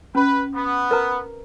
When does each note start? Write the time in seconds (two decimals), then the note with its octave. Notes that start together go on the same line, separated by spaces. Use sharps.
0.15 C#4 B4
0.54 B3
0.91 A#4 B4 A#5